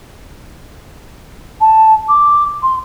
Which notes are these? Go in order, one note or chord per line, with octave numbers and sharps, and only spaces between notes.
A5
D6
C6